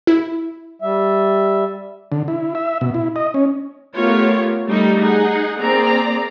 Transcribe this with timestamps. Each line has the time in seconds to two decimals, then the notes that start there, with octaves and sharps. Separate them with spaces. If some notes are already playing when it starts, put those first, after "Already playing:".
0.07 E4
0.82 G3 E5
2.12 D3
2.28 E4
2.55 E5
2.81 B2
2.94 E4
3.16 D#5
3.34 C#4
3.96 A3 B3 F4 G4 A#4 C#5
4.68 G3 A3 D#4 G4
5.03 D#4 G#4 F#5
5.60 A#3 C4 G#4 D5 A#5